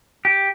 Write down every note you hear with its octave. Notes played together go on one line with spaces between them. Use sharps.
G4